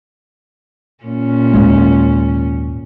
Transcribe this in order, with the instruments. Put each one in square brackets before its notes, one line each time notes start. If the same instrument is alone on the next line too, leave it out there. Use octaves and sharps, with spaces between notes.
[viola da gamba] A#2 C#4
[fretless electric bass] D#2 G#2 G#3